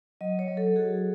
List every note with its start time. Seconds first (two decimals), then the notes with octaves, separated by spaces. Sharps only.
0.21 F#3 D#5
0.39 C#5
0.48 F#3
0.57 A4
0.76 F#4 G#4